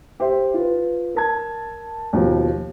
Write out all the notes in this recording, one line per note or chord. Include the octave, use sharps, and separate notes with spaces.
G4 C5 E5
F4 B4
A#4 A5 G#6
D#2 B2 F3